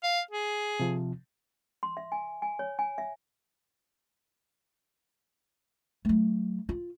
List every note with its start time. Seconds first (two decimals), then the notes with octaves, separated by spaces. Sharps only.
0.03 F5
0.31 G#4
0.80 C3 F3
1.83 C6
1.97 E5
2.12 G#5
2.42 G#5
2.59 C#5
2.79 G#5
2.98 E5
6.05 F#3 A3
6.69 F4